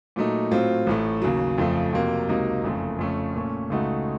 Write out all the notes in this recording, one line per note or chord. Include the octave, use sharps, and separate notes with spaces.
A#2 F#3 A3 D#4
A2 F#3 C4 F4
A1 A2 A3
D#2 C#3 F#3
F2 C#3 F3 A3
F2 C3 F#3 A#3
C#2 C3 F#3 A#3 D#4
F#1 F2 C#3 A3
F2 C#3 A3 C#4
A#2 A3 C#4
C#2 C#3 A3 D#4 F#4